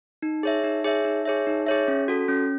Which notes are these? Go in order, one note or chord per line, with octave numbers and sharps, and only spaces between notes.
D#4
G#4 C#5 E5
D#4
G#4 C#5 E5
D#4
G#4 C#5 E5
D#4
G#4 C#5 E5
C#4
F#4 A4
C#4